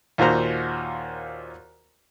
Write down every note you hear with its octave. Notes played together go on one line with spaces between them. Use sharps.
D#2 A#2 F#4 C5 A#5